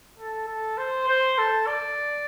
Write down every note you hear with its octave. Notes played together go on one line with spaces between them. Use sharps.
A4
A4
C5
C5
A4
D5